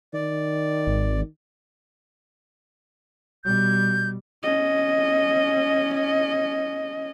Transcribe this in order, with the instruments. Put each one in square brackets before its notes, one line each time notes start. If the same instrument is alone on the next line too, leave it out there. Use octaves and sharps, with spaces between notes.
[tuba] D#3 [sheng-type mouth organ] D5
[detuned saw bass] G#1
[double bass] B2 G3 [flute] G6
[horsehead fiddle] C#4 D#5